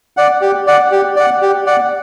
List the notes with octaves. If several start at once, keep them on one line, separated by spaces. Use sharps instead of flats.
D5 F#5
G4
D5 F#5
G4
D5 F#5
G4
D5 F#5